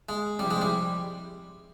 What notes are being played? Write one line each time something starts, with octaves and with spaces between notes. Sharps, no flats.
G#3
C3 F3 G3 C4 E4 G4
G#3
G3